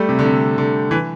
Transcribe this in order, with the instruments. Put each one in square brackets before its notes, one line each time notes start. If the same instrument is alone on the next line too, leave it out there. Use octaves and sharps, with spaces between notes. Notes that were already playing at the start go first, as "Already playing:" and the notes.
Already playing: [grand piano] G3 A3
C3
D3
C3
D3
E3